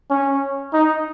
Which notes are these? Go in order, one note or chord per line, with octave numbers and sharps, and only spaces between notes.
C#4
D#4